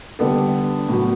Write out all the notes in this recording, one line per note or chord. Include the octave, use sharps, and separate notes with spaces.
D3 G3 B3 D4 A4
A2 F#3 B3